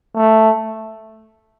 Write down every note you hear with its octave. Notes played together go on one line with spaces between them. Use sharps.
A3